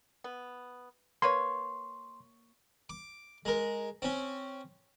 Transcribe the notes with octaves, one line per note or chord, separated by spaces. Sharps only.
B3
A#3 B4 C#5 C6
D6
G#3 A#4
C4 C#4